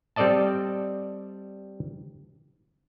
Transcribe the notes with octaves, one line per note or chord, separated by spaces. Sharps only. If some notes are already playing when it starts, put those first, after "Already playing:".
G3 C4 A4 D5 D#5 A5